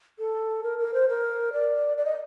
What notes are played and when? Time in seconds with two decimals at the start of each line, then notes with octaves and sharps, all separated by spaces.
0.19 A4
0.63 A#4
0.79 A#4
0.94 C5
1.09 A#4
1.53 D5
1.98 D5
2.05 D#5